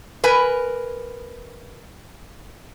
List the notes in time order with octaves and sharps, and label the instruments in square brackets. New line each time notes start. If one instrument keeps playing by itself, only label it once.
[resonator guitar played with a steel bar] A#4 B4 G#5